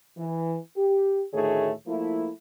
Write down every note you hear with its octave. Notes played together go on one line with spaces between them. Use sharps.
E3
G4
D2 A2 D#3 A3 G#4 C#5
F3 A3 A#3 E4